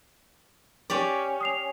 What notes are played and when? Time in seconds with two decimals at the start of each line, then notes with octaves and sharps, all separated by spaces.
0.90 C#4 G4 D5
1.41 D#6 C7 F7